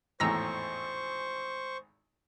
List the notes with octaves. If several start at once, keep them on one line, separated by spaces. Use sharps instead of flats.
G#1 E2 A2 C5 A#5 C#6 E6 A#6